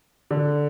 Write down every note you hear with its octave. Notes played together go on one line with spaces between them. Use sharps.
D3